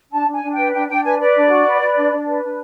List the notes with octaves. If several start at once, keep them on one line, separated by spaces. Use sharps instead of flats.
D4 A5
D4
G#5
D4
B4 G5
D4 G5
D4 G5
B4 G#5
B4 D5
D4
F#4
B4
B4
D4
D4
B4
D4